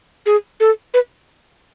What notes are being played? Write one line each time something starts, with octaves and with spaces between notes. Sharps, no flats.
G#4
A4
B4